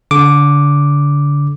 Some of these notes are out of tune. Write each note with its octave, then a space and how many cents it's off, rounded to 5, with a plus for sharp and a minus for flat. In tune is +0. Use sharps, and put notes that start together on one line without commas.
D3 -30 D6 +0